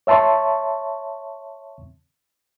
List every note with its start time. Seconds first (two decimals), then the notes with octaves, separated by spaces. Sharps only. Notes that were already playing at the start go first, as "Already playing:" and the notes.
0.07 C#5 E5 A5 C6 C#6